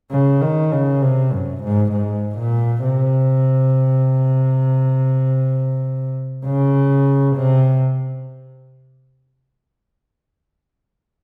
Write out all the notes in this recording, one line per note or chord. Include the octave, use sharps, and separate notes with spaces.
C#3
D#3
C#3
C3
F#2
G#2
G#2
A#2
C3
C#3
C3